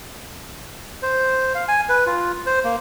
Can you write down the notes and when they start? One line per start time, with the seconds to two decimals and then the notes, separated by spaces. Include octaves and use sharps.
1.03 C5
1.55 F5
1.68 G#5
1.89 B4
2.06 F4
2.46 C5
2.64 A#3